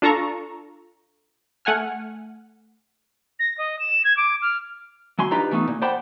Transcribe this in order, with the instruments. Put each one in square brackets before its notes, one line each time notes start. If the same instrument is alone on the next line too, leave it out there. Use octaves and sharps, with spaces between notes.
[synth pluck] D4 F4 A4 A5 A#5 C#6
A3 F#5 G#5 F6
[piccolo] A#6
D#5
E7
G#6
D6
F6
[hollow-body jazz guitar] F#3 G#5 C6
D4 D#4 F4 G4 B4 A#5
E3 A3 B3 D#4
A#2
C5 D5 F#5 G5 A5 B5